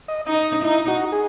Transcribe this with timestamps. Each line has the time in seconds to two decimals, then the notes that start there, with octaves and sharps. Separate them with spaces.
0.08 D#5
0.26 D#4 D#5
0.63 D#4 E4
0.88 F#4
1.12 G#4